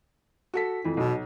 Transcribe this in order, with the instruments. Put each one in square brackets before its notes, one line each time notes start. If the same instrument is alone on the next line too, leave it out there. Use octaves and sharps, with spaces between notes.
[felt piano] F#4 A4 B6
F2 E3
[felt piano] B1 [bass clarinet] B2